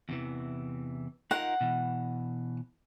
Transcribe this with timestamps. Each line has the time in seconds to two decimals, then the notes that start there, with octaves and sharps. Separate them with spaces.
0.09 E2 C3 E3
1.31 D#4 F4 A#4 F#5
1.61 B2 E3